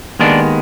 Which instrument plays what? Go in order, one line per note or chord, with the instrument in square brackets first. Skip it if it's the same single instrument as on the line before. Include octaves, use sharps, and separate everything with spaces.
[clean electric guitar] D#2 D#3 G#3 B3 D4